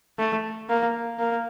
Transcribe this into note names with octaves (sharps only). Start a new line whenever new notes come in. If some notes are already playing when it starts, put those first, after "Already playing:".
A3
A#3
A#3